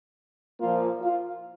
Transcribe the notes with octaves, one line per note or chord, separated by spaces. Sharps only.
A#2 F3 A#3 F4
F4